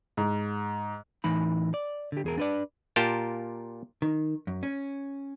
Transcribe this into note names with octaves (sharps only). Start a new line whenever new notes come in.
G#2
A2 E3 D#4 B5
D5
D3 G4
E2 G#4 A#4
D4 B4 D5
A#2 F4 G4 A#4 G5 A5
D#3
F#2
C#4